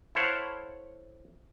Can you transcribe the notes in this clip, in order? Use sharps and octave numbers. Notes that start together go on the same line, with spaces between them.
E4 A4 C5 C#5 F5 F#5